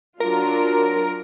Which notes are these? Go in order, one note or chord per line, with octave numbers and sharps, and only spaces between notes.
F#3 D4 F4 A#4